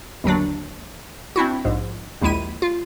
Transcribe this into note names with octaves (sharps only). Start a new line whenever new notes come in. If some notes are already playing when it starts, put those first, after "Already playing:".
G1 D#2 F#3 D4
C4 D4 E4 F#4
A#1 G#2
A#1 D#2 G#3 E4 D#7
F4